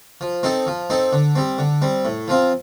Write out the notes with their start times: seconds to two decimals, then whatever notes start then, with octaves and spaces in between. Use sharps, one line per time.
0.21 F3
0.43 C4 D#4 A4
0.67 F3
0.90 C4 D#4 A4
1.13 D3
1.36 G3 C4
1.58 D3
1.82 G3 C4
2.05 A2
2.28 F3 C4 F4